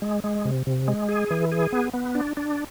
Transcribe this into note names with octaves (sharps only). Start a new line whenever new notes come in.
G#3
G#3
C3
C3
G#3
G#4
E3
G#4
B3
B3
D4
D4